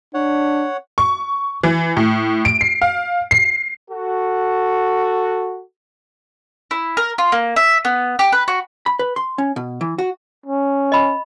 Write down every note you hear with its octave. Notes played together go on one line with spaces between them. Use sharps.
D4 C#5 F#5
C#6
E3
A2
D7
C7
F5
C7
F#4 A4
E4
A#4
F4
A#3
E5
B3
G4
B4
F#4
B5
B4
C6
C#4
B2
E3
F#4
C#4
D#5 B5